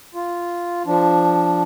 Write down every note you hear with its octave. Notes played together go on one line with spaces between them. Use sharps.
F4
F3 D4